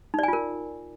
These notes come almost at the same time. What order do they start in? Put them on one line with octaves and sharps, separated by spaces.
D#4 D5 G#5 F4 A#4